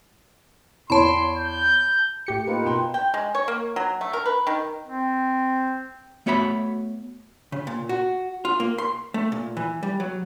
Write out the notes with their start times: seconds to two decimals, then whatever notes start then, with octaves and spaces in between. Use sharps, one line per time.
0.90 E2 C#5 A5 B5 C6
1.37 G6
2.26 A2 G4 C#7
2.47 A#3 D#4 F4 B4
2.66 B2 G5 C6
2.94 G5
3.14 G#3
3.35 C#5
3.48 A#3
3.76 F#3
4.01 A3
4.13 A#4
4.26 B4
4.47 D#3
4.87 C4
6.26 A3 B3 F#4 C#5 E5 B5
7.52 C#3
7.67 A#2
7.89 F#4
8.45 F4
8.60 A#3
8.78 C6
9.14 A3
9.32 A#2
9.57 E3
9.83 G3
10.00 F#3